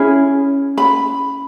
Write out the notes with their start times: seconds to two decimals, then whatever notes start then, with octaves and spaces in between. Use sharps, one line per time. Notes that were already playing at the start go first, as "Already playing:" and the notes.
Already playing: C#4 E4 G#4 B5
0.78 B5